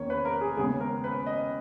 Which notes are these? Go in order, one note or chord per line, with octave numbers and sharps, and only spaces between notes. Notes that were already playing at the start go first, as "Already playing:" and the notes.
Already playing: E2 D#3 A#3 C#4 C#5
B4
A#4
G#4
D#2 C#3 G#3 B3 G#4
A#4
B4
D#5